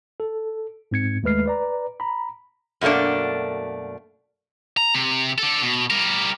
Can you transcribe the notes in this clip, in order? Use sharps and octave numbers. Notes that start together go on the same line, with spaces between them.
A4
G#2 C4 G#6 C#7
D#2 G#3 A3 B4 F6 C7
B4 D5 A#5
A#5 B5
F#2 B2 A3 A#3 D4
A#5
C3
D4 A4
B2
G3 A#4